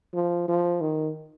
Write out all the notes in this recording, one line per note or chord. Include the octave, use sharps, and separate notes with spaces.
F3
F3
D#3